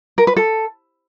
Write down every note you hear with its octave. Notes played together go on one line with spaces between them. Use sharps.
A#4
B4
A4